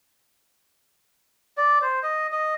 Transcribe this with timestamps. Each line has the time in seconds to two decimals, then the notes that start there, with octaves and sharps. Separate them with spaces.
1.57 D5
1.82 C5
2.03 D#5
2.32 D#5